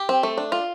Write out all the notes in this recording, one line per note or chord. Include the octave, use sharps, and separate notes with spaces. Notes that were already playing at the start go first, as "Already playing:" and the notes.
Already playing: G4
C4
A3
D4
F4